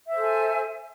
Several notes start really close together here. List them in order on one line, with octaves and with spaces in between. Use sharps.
E5 C5 A4 G#5